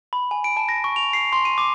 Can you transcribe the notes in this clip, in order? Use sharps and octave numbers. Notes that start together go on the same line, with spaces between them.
B5
G#5
D7
A5
A#6
C#6
F7
C7
C6
D#7
D6